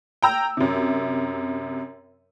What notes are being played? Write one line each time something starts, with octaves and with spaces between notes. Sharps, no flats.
G5 A#5 E6
F#2 C3